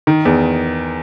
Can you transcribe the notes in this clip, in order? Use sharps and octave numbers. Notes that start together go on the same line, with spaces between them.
D#3
E2